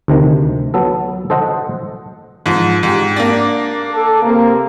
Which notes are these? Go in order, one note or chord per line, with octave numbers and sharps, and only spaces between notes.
D2 C3 D#3
F#3 B3 A4
A4 C5 D#5 F#5
G#2 F3
G#2 G4
A#3 D4
A4
C3 A#3